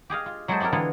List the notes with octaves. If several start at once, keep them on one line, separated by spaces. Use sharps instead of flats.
G4 G#4 D#5 F5
F4
F#3 G#3 E4 G#4 A4 C5
C4 E4 G4 A4 A#4
D3 E3 B3 E4 F4 G#4